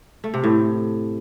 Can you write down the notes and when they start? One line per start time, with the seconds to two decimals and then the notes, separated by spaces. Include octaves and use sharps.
0.24 A3
0.34 C3
0.44 A2